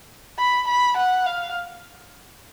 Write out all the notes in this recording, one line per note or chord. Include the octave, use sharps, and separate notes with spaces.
B5
B5
F#5
F5